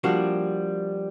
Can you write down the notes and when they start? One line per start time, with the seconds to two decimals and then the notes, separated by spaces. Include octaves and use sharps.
0.04 F3 G3 A#3 D4 F#4